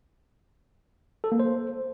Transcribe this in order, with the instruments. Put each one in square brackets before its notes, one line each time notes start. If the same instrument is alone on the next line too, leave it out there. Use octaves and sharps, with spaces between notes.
[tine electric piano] A4
A#3
C5